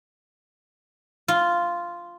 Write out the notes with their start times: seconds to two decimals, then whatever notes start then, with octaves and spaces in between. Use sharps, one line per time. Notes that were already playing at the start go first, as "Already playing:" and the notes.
1.28 F4